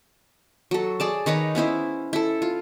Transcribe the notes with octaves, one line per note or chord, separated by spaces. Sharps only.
F#3 A4
G#4 D5 A5
D#3 D#4 B4 C#5
B3 C#4 E4 C5
E4 A4
F4